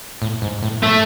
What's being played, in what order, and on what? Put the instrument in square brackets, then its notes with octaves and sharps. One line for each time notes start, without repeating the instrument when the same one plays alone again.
[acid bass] A2
G#2
A2
[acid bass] A2 [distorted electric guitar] A3